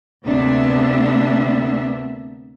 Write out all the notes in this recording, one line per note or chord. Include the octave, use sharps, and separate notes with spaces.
D2 C3 A#3 B3 D4 E5